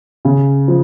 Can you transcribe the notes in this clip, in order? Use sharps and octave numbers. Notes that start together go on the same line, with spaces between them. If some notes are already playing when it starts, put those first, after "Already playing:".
C#3
F3